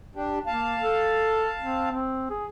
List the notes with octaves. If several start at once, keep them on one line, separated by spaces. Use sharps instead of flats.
D4 G4
A#3 F5 A5
A4
C4
C4
G#4